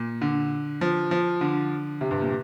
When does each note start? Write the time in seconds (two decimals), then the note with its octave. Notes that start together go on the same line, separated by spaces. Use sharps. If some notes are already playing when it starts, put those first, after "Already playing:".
Already playing: A#2
0.21 D3
0.81 F3
1.11 F3
1.41 D3
2.01 C3
2.11 G2
2.21 A#2